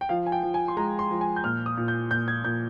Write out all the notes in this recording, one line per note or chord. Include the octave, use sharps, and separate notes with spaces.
G5
F3 F5
G#5
G5
F3
G#5
C6
G#3 A#5
C6
F3
G#5
G6
A#2 F6
D#6
A#2
G6
A#2 G6
G#6
A#2 G6